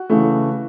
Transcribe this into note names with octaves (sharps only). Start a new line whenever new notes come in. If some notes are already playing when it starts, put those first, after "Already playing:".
Already playing: F#4
C#3 E3 A3